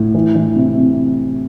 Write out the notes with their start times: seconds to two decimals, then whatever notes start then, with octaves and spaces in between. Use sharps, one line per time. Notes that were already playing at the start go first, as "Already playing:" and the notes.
Already playing: A2
0.15 E3
0.35 E3
0.56 C3
0.77 C3